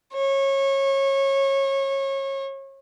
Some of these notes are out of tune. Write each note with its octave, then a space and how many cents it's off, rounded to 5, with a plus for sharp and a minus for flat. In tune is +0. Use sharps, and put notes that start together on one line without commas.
C#5 -25